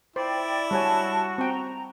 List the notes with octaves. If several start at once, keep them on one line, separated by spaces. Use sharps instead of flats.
E4 C5 D5 G5
G3 F#4 C#5 G#5 A5
C4 G5 A#5